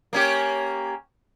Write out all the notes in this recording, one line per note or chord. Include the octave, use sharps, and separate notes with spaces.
A#3 C#4 G4